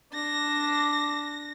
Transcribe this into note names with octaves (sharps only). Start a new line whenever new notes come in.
D4 A#6